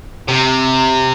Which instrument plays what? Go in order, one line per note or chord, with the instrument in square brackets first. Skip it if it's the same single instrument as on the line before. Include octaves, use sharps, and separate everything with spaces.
[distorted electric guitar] C3